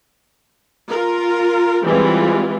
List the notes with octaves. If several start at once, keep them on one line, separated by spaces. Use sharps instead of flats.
F4 A#4
E3 G3 G#3 C4 F4